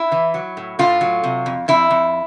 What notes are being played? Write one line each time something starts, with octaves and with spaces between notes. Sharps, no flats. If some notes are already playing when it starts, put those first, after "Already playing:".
Already playing: E4
E3
F#3
A2
A2 F4
F#3
C3
F2
F2 E4
F2